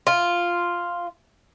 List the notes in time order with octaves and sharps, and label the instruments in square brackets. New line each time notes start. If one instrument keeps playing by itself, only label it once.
[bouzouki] F4